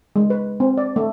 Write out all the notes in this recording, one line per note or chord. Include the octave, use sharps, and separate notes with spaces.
G#3
B4
C4
D5
A3